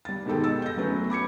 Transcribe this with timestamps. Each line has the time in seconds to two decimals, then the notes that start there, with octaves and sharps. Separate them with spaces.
0.05 G3 A6
0.26 G#2 B2 D#3 G4 A4 G5
0.44 D#5 E6 A6
0.62 G6 A#6
0.77 F#3 A3 B3 C#4
1.10 B5 D6 G#6 C#7